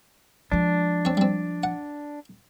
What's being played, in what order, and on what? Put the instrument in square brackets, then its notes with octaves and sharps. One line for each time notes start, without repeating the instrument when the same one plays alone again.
[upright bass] F3 G#3 [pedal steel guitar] D4
[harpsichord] C4 C#5
G3 C4
F#5